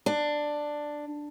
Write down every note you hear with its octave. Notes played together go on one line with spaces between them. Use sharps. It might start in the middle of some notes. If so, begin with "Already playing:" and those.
D4